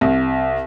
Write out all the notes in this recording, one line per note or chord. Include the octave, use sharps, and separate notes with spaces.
C2